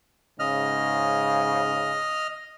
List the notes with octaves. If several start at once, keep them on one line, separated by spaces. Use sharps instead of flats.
G#2 C#3 D#5 F6